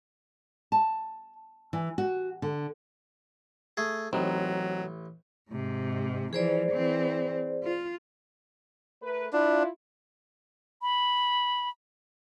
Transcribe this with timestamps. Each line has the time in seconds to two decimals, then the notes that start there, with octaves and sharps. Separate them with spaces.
0.72 A5
1.73 E3
1.98 F#4
2.42 D3
3.77 A3 G#4
4.13 A1 F#3 C4 D#4
5.50 G#2 C3
6.33 E3 F3 G#4 C5 D5
6.71 E3 C4
7.63 F4
9.02 A3 A#4 B4
9.33 D4 E4 F4
10.82 B5